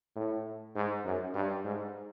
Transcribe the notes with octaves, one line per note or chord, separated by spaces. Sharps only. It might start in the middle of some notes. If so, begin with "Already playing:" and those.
A2
G#2
F#2
G2
G#2